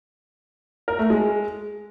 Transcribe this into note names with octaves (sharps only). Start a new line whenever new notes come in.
A#4
A3
G#3